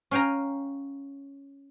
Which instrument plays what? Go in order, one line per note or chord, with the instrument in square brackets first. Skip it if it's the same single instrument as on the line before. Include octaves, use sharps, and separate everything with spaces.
[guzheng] C#4 F5 G5 G#5 A#5